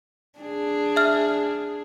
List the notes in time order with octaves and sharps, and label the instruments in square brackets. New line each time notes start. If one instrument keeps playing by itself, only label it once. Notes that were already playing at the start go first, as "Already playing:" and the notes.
[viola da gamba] D4 G#4
[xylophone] E5 F6